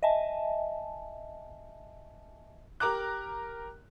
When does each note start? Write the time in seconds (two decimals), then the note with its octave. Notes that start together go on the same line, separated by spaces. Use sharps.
0.03 D#5 E5 G#5 A5
2.80 G4 A#4 A#5 D6 F#6